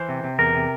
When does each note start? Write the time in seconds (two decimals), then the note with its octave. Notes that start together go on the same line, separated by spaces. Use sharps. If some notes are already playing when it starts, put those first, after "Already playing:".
Already playing: E3 C5
0.09 C3
0.24 C3
0.39 E2 A#4
0.54 C3